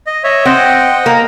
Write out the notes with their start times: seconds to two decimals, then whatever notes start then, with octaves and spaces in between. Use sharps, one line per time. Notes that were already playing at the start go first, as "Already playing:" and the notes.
0.07 D#5
0.24 C#5 D#5 E5
0.45 C4 D#5 F#5 G5
1.06 A#3